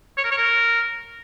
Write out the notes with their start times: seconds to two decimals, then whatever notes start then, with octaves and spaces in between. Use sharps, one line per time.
0.17 C#5
0.24 A#4
0.31 C#5
0.38 A#4